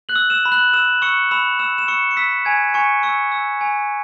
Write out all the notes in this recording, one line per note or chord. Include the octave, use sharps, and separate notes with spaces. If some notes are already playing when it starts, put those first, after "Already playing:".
F#6 F#7
E6
E6 E7
B5
F#6 F#7
E6 E7
C#6 E6 C#7
B5 E6 E7
E6 E7
E7
C#6 E6 C#7
C#7
E6 B6
G#5 G#6
G#5 C#6 C#7
C#6 E6 C#7
E6
G#5